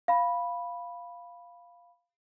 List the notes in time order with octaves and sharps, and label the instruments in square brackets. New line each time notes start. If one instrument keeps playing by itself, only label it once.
[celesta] F5 B5